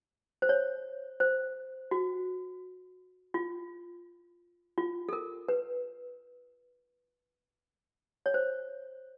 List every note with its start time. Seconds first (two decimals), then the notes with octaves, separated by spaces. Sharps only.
0.42 C5
0.49 C#5
1.20 C5
1.91 F#4
3.34 F4
4.78 F4
5.09 A4
5.13 A#4
5.49 B4
8.26 C#5
8.34 C5